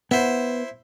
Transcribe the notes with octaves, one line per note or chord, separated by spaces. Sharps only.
B3 E4 C5